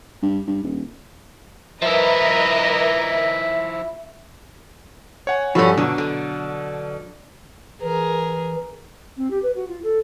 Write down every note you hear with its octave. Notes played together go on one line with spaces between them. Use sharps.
G2
G2
D#1
F3 E4 A#4 B4 D#5 E5
C#5 F#5 G#5
G2 F3 G3 C#4 F#4 A4 B5
B2 D3 F#3 D4
D3
E3 G#4 A#4
C4
G4
B4
F#4
F4
A4